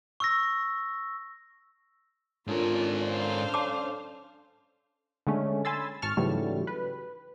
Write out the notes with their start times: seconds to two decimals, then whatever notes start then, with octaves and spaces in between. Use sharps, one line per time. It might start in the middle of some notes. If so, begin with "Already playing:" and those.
0.20 C#6 E6 A#6
2.47 G#2 C#4 D4 F4 A4 A#4
3.05 C5 F5
3.54 A5 D6
5.27 D3 G#3 A3 C#4
5.65 G#5 B5 C6 E6 A6
6.02 G#1 A5 C#6 F6
6.17 G#2 C#3 E3 F#3 G3 A3
6.67 B4